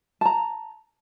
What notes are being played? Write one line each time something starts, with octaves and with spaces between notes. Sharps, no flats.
A5 A#5